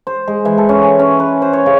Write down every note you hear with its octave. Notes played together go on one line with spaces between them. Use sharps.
C5
G#3
E3
A4
C#4
G#5
C#4
B4
C5
C#5
C#3